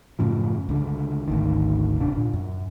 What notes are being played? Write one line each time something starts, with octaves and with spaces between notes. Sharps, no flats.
F#2 A2 C#3 F3
C#2 D3
G#1 D2 D#3
D#1 C3 D4
A#2
F#2